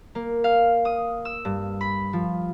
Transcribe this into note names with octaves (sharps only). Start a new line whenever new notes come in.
A#3
F5
D#6
E6
G2
B5
F3